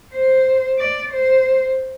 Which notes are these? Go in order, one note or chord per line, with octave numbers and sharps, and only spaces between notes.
C5
D5
C5